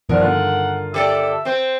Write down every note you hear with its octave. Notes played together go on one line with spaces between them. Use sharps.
G2 D#3 F3 B3 D4 A#4
D3 F4 F#5
G4 A4 D5 E5
C4 C5